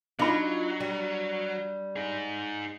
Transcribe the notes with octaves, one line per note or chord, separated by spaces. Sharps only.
F#3 D4 D#4 F4 B5
G3
D#4 G#4